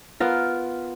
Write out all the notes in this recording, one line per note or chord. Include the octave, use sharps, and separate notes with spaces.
B3 F4 A#4